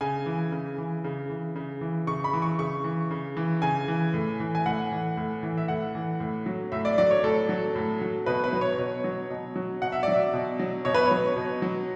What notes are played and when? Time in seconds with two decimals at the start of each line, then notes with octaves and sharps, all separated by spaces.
0.01 C#3 G#5
0.26 E3
0.52 C#3
0.78 E3
1.04 C#3
1.30 E3
1.56 C#3
1.81 E3
2.07 C#3 C#6
2.24 B5
2.33 E3
2.42 C#6
2.59 C#3 C#6
2.84 E3
3.11 C#3
3.37 E3
3.62 C#3 G#5
3.88 E3
4.14 A2
4.40 E3
4.55 G#5
4.66 A2 F#5
4.92 E3
5.17 A2
5.43 E3
5.58 E5
5.68 A2 F#5
5.95 E3
6.20 A2
6.46 F#3
6.72 A2 E5
6.85 D5
6.98 F#3 D5
7.11 C#5
7.23 A2 A4
7.49 F#3
7.75 A2
8.01 F#3
8.26 B2 B4
8.44 B4
8.53 F#3
8.61 C#5
8.78 B2 C#5
9.04 F#3
9.30 B2
9.56 F#3
9.82 B2 F#5
9.92 E5
10.03 F#3 D5
10.13 E5
10.33 B2
10.59 F#3
10.85 B2 C#5
10.94 B4
11.05 C#5
11.11 F#3
11.36 B2
11.62 F#3